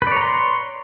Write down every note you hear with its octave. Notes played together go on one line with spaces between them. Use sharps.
B4 C#5 D5 A#5 C6